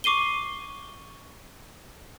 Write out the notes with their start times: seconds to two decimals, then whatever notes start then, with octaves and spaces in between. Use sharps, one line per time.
0.04 C#6 D6 C7 D#7 G7